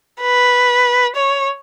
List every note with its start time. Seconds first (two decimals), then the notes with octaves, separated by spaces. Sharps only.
0.21 B4
1.16 C#5